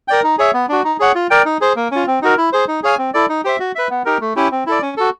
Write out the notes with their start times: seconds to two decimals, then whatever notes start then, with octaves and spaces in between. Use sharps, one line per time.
0.08 A#4 D5 G5
0.23 D#4
0.38 G#4 C#5 E5
0.54 B3
0.69 D4 F#4
0.84 D#4
1.00 G#4 C#5 F#5
1.15 F4
1.30 A#4 D5 G5
1.45 D#4
1.61 G#4 C5
1.76 A#3
1.91 C#4 F4
2.07 C4
2.22 D#4 F#4 A#4
2.37 E4
2.53 G#4 C5
2.68 D#4
2.83 G#4 C#5 F5 G#5
2.98 C4
3.14 E4 A4 D5
3.29 D#4
3.44 G4 C5 E5
3.60 F#4
3.75 B4 E5
3.90 B3
4.05 D#4 G4 A#4
4.21 A3
4.36 C#4 E4 G4
4.52 C4
4.66 E4 A4 D5
4.82 C#4
4.97 F#4 A4